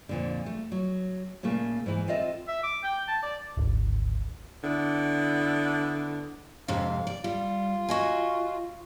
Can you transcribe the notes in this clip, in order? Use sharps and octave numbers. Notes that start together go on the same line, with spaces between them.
F2 A#2 D3
A3
F#3
A#2 C#3 A3 A#3
G#2 E3
C4 F4 A4 D#5 E5
E5
D6
G5
A5
D5
D1 G#1
D3 B3 D4 E4
F2 G#2 C3 F5
D5
G3 F4
F#4 D#5 G#5